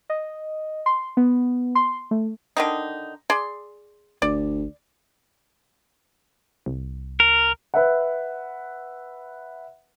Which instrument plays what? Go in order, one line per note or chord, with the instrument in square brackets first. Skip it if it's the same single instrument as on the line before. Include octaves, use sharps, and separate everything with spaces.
[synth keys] D#5
C6
B3
C6
A3
[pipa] D3 D#3 D#4
G#4 D5 C6
[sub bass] G1 [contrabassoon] D2 [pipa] D5
[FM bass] C2
[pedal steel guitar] A#4
[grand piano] B4 E5 F#5